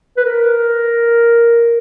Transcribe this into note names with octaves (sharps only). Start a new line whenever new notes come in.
B4
A#4